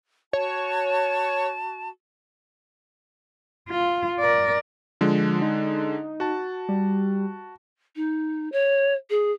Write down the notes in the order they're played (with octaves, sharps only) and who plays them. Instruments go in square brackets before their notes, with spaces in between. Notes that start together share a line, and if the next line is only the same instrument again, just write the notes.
[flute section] F#4 A5 [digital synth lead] C#5
[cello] F4
A#4 D5
[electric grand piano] D3 G#3 [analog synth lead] F3
[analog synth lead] D#4
[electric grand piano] F#4 A5
[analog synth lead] G3
[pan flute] D#4
C#5
G#4